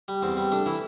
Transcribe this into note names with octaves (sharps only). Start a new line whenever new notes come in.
G3
E2 C4
G3
A3 D4
E3 E4